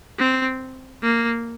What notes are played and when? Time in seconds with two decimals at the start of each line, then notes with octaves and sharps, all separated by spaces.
0.19 C4
1.02 A#3